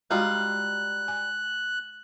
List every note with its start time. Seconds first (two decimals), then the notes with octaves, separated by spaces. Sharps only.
0.11 G3 G#3 D#4 F4 F#4 F#6
1.08 G#5